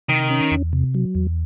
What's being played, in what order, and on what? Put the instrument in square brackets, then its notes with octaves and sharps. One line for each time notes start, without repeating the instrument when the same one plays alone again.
[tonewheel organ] C3 [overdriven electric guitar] D#3
[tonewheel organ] C#4
E2
C3
F#3
E2